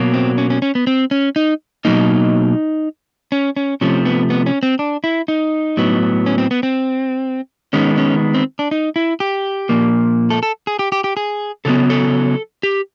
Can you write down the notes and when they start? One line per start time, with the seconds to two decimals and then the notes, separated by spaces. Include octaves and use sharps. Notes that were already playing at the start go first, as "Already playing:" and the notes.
Already playing: B2 F#3 A#3
0.14 C4
0.38 C#4
0.50 C#4
0.62 C#4
0.75 B3
0.87 C4
1.11 C#4
1.36 D#4
1.85 B2 F#3 A#3 D#4
3.32 C#4
3.57 C#4
3.81 C3 F3 A3 C#4
4.06 B3
4.30 B3
4.46 C#4
4.63 C4
4.79 D4
5.04 E4
5.28 D#4
5.77 A2 F#3 B3
6.26 C#4
6.38 C4
6.51 B3
6.63 C4
7.73 D#3 G#3 B3 C#4
7.98 C#4
8.35 C4
8.59 D4
8.71 D#4
8.96 E4
9.20 G4
9.69 A#2 F3 A#3
10.30 A4
10.43 A4
10.67 G#4
10.79 G4
10.92 G4
11.04 G4
11.17 G#4
11.65 C#3 F#3 B3 A4
11.90 A4
12.63 G4